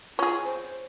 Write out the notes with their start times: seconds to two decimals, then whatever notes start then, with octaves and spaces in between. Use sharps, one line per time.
0.19 C#4 F4 G#4
0.45 C5